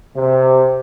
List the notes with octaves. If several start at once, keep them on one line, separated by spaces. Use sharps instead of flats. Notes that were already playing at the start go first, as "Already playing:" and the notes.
C3